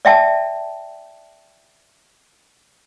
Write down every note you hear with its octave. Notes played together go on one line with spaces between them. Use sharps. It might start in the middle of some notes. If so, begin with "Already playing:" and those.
D5 E5 G5 A5